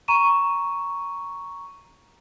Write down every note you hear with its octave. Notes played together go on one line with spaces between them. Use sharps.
A#5 C#6 D#7 E7